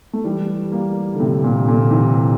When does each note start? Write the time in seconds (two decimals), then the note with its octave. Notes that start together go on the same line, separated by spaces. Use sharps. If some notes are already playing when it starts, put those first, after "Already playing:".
0.13 A3
0.24 E3 G3
0.72 G3 A#3
1.14 D3
1.19 A2 C3
1.44 A#2
1.67 A#2 D3
1.91 C3 E3